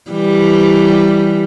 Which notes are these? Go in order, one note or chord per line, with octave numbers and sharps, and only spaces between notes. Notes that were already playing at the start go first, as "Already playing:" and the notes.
E3 G3